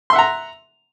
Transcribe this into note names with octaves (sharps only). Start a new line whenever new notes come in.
E5 F#5 A#5 C6